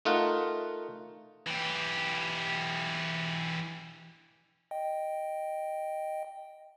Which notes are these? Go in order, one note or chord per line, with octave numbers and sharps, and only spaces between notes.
A3 D#4 F4 A#4 F#5
E3 G4
D#5 G5